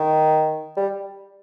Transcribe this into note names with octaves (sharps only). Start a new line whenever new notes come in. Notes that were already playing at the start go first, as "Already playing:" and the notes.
Already playing: D#3
G3